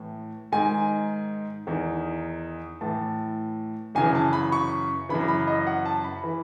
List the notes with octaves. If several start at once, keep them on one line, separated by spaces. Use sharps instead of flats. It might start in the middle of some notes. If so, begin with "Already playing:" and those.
Already playing: A2 E3
G#2 D#3 G#5
E2 D#3
A2 E3 A5
F#2 C#3 E3 G#5
A5
B5
C#6
F#2 C#3 E3 B5
B5
D#5
F#5
A5
B5
E3